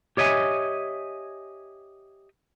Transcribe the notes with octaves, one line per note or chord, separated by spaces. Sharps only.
G4 C#5 D#5 E5 G#5